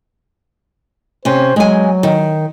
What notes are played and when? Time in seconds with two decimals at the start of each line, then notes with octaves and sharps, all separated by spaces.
1.25 C3 C#4 C5
1.56 F#3 G#3 G#5
2.03 D#3